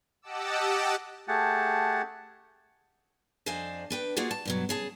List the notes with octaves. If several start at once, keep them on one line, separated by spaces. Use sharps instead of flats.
G4 D#5 F#5 A5 D6 E6
A3 G4 G#4 F#5 A5
F2 D4 C5 D#5 F5 G#5
D4 B4 G5
A#3 F4 F#4 G#4 D5
A5
G2 B2 F#3
C#3 G#4 A5